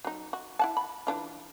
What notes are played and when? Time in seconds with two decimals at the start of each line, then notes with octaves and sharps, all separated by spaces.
0.05 F#3 D#4
0.33 F#4
0.59 E4 F#5 A5
0.77 B5
1.07 E3 D4 F4